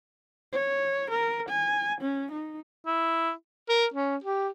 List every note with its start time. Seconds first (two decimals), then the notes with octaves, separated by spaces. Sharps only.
0.53 C#5
1.10 A#4
1.49 G#5
2.01 C#4
2.32 D#4
2.86 E4
3.69 A#4
3.94 C#4
4.24 G4